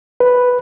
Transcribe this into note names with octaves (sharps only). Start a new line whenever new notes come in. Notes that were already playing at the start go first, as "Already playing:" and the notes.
B4